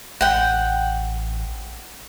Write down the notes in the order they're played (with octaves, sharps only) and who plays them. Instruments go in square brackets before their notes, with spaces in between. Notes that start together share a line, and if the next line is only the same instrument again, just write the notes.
[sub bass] A1 [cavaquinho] F#5 G5